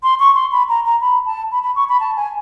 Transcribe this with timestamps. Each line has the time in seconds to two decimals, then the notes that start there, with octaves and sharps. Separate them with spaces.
0.03 C6
0.20 C#6
0.35 C6
0.52 B5
0.69 A#5
0.84 A#5
1.01 B5
1.26 A5
1.52 B5
1.63 B5
1.76 C#6
1.89 B5
2.00 A5
2.17 G#5